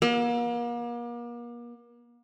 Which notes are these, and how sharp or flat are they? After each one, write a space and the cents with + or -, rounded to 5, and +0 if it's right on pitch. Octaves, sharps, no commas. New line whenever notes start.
A#3 +40